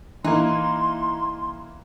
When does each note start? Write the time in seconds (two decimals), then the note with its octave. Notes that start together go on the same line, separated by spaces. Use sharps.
0.24 E3 A#3 D#4 C6